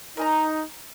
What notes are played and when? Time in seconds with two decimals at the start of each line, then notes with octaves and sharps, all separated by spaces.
0.17 D#4 A#4 G#5 A#5